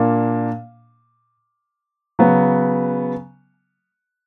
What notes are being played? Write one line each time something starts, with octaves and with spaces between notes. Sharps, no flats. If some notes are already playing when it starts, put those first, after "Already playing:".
Already playing: A#2 A#3 D4
C#3 F#3 B3